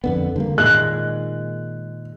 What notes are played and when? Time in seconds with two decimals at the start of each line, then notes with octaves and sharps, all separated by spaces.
0.04 F2 D3 B3
0.36 D3 G3 A#3
0.58 A#2 D#3 G#3 F#6